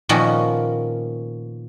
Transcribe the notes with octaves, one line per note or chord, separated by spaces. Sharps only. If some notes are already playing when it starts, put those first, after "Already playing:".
A#2 D#3 F3 B3 C#4 F#4